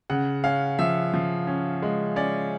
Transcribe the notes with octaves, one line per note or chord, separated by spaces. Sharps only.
C#3 F#5
C#4 F5
F3 E5
F3
C#4
G#3
C#4 D5